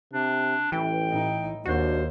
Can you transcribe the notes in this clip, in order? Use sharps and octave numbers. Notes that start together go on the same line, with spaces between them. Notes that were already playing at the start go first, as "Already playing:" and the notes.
C3 D4
A1 E3 G5
A2 D#4
D#2 D4 F#4 C5